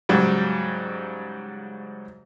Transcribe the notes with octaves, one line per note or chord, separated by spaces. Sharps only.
G#2 C#3 F#3 G3